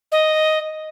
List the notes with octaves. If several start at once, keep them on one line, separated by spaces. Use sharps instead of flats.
D#5